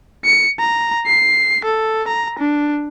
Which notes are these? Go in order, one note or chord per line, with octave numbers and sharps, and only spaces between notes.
C#7
A#5
C7
A4
A#5
D4